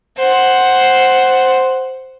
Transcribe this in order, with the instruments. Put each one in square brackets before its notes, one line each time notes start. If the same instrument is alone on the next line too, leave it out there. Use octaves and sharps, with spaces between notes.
[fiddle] C5 F#5